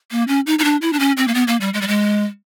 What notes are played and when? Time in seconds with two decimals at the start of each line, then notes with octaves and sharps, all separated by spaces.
0.11 A#3
0.28 C#4
0.47 D#4
0.59 D#4
0.64 D4
0.82 E4
0.93 D4
1.00 C#4
1.17 C4
1.28 A#3
1.34 B3
1.47 A#3
1.61 G3
1.74 G#3
1.82 G3
1.87 G#3